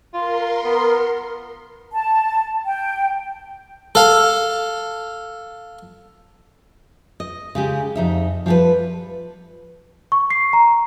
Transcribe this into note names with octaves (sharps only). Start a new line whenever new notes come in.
F4 A#4 C6
B3
A5
G5
A4 F5
D#5
C#3 G#3 G4
F2 D#4 E5
F3 G3 G4 A4 B4
C#6
C7
A#5